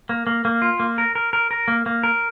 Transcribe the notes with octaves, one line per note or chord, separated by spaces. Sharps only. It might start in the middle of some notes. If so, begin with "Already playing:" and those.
A#3
A#3
A#3
F4
A#3
A#4
A#4
A#4
A#4
A#3
A#3
A#4